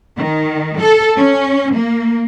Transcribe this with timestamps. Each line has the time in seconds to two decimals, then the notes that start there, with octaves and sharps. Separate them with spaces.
0.17 D#3
0.79 A4
1.16 C#4
1.74 A#3